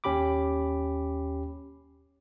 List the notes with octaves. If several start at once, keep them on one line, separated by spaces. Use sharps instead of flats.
D#2 C#4 G4 B5 D6